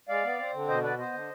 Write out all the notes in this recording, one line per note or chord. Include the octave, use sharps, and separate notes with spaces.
G#3 D5 F5
B3
C4
D3
B2 C5 D#5
B3 B4 D5
B3 C5 D#5
D3